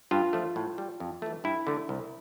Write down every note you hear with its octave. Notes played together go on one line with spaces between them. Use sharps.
G2 F4
F3 A3
A2
G3
F2
E3 A3
G2 E4
D3 A3
C2